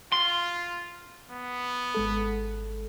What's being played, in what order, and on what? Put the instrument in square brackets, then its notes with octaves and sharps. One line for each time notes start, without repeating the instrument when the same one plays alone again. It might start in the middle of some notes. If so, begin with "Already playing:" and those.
[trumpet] F4 [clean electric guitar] C6
[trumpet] B3
[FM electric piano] G#1 G#3 A4